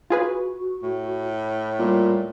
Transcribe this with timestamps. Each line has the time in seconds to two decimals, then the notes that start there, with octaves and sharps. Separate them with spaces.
0.10 F4 F#4 G#4 B4
0.83 A2
1.79 A#2 G3